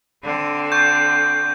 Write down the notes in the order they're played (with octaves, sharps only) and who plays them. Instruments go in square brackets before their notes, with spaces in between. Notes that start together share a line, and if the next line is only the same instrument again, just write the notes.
[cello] D3 C4
[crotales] C#6 G6